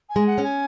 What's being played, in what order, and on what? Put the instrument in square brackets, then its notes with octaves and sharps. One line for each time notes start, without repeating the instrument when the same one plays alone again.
[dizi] G#5
[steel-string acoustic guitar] G#3
[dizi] F#5
[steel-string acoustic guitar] C#4
[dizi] G#5